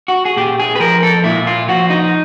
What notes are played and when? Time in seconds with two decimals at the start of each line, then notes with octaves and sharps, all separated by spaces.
0.08 F#4
0.25 G#4
0.36 A#2 G4
0.60 G#4
0.76 B4
0.80 F3 A#4
1.03 A4
1.24 A#2 E4
1.47 F4
1.68 F3 F#4
1.90 D#4